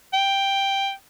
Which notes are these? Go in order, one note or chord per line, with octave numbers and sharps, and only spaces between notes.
G5